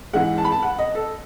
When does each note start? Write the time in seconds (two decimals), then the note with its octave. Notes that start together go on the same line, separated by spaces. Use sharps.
0.14 G#2 E3 G#3 F#5
0.38 A5
0.45 B5
0.52 A5
0.63 F#5
0.79 D#5
0.95 A4